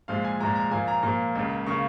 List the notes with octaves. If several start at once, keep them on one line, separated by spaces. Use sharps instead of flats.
A#2 F3 G#3 F5
G#5
A#2 F3 G#3 A#5
A#5
A#2 F3 A#3 G#5
A#5
A#2 F3 A#3 A#5
C#2 C#3 A#3
C#3 A#3 C#6